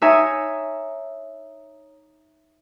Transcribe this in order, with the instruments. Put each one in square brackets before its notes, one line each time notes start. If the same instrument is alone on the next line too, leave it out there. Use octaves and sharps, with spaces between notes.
[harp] D#4 C#5 E5 G#5